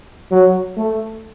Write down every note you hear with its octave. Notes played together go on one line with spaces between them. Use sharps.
F#3
A3